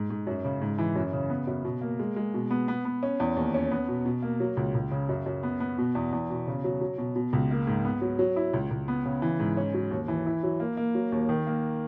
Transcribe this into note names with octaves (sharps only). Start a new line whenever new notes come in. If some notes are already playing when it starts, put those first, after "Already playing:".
Already playing: G#2
G#2
F#2
C#3
G#2
E3
F#2
C#3
B3
F#2
B2
A#3
G#3
G#3
B2
B3
B3
B3
C#4
E2
D#2
C#4
B3
B2
B2
A#3
F#3
C#2
C#2
C#3
F#2
F#2
B3
B3
B2
E2
E2
B2
C#3
F#3
F#3
B2
B2
C#2
A#3
G#2
B3
F#3
F#3
E4
C#2
C#2
B3
C#3
E3
G#2
C#4
F#3
D#2
E3
E4
F#3
A#3
A#3
F#3
D#2
D#3
A#3